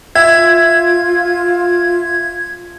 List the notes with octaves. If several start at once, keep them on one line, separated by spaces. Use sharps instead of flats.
F4 E5 G#6